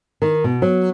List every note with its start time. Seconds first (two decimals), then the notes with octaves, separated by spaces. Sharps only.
0.22 D#3
0.44 B2
0.62 F#3